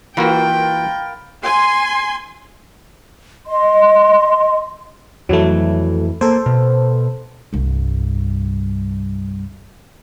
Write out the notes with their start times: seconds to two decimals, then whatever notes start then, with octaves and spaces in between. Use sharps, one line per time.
0.17 E3 A#3 F4 F#4 A#4 B4 G5
1.43 G#5 C6
3.47 D#5 C6
5.29 F2 E3 F#3 A3
6.21 A#3 A4 C5
6.46 B2
7.53 C2 G2